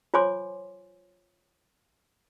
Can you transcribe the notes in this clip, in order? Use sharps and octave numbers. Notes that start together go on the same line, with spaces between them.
F4 C5 C#5 G#5 C6 D6